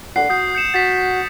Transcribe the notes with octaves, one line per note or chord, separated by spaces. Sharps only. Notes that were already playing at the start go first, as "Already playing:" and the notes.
D3 F#5 C7
F#4 D#6 G6 C7
G6 C#7 E7
F#4 A6 B6 C7